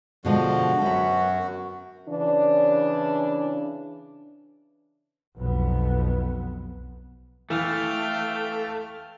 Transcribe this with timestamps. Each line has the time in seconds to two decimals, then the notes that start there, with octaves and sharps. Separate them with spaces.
0.25 B2 D3 F3 G#3 F#4
0.82 F#2 C#4 B4
2.08 C#3 E3 D4
5.36 B1 F2 B3
7.50 E3 A3 F5 G5